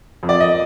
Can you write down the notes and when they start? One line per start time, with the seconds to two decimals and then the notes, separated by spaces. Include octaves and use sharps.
0.23 F2
0.29 D5
0.40 D#5